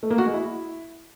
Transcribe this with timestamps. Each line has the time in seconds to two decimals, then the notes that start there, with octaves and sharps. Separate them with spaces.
0.03 A3
0.10 A#3
0.18 F#4
0.26 G#3
0.34 E4